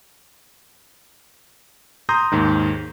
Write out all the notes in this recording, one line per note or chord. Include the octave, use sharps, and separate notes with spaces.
A#5 C6 D#6 G6 A#6
D#2 G#2 D#3